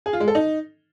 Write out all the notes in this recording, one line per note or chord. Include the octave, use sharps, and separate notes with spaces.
G#4
F4
G#3
A4
D#4